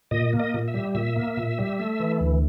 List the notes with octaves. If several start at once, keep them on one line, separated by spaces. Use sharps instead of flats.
A#2 D#5
A#3
D#5
A#2
E5
G3
A#2 E5
A#3
A#2
G3
A3
E3
D2